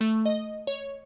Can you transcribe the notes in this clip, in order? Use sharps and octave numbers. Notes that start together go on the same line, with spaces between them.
A3
D#5
C#5